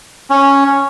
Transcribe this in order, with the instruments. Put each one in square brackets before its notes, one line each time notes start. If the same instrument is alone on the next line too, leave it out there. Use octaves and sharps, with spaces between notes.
[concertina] C#4